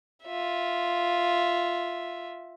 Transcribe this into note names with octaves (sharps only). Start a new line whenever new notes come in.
F4 E5